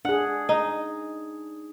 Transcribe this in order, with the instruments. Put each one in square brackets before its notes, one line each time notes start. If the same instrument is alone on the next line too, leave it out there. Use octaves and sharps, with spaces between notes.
[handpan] D4 G#4 [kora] F#5
[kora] D#4